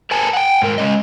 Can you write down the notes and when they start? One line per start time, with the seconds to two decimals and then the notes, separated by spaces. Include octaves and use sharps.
0.11 A#4 B4 G#5 A5
0.33 F#5 G5
0.62 G#2 A#4
0.78 G#3 C#4 D#5